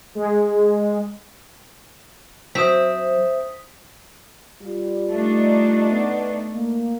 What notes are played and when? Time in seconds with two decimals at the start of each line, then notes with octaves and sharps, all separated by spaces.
0.15 G#3
2.55 F#3 C4 C5 E5 D#6 B6
4.61 G3 F4
5.10 A3 D4 D#4
5.91 B3
6.53 A#3